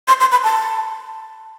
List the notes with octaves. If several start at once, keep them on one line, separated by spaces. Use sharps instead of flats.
C6
C6
B5
A5